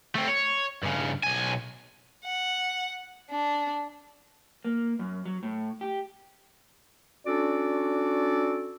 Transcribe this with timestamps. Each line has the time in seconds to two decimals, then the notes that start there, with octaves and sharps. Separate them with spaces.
0.15 A3 C4
0.28 C#5
0.83 G2 C#3
1.23 B1 G#5
2.25 F#5
3.30 D4
4.65 A#3
4.99 F#2
5.25 F#3
5.43 A2
5.81 G4
7.26 C#4 D4 F#4 A4 D5